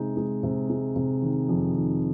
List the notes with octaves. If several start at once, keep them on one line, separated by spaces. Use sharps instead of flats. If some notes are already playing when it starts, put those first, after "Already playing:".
Already playing: C3 G#3 D#4
G#3
C3
G#3
C3
D#3
F2
D#3